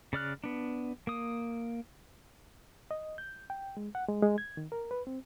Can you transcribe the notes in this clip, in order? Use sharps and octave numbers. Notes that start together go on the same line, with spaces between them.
C#3 D5 F6 F#6
B3 D4
A#3 D#6
D#5
G6
G5
G#3
F#5
G#3
G#3
G#6
D#3
A#4
B4
C4